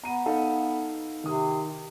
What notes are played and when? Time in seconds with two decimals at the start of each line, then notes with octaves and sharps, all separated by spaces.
0.04 B3 A#5 D#7
0.26 D#4 A4 F5
1.24 C3 D#3 D#6